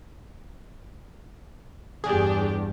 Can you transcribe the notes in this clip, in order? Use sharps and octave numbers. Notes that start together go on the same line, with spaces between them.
E2 G2 D4 G4 G#4